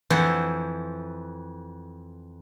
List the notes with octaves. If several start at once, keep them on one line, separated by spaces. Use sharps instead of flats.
F2 E3 E4 C5 F#5